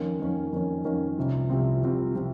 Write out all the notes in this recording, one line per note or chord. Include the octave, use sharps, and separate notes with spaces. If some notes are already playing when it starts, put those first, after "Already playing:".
Already playing: F2 D#3 A#3 C#4
F2 D#3 A#3 C#4
F2 D#3 A#3 C#4
F2 D#3 A#3 C#4
C2 C3 F3 C4
C2 C3 F3 C4
C2 C3 F3 C4
C3 F3 C4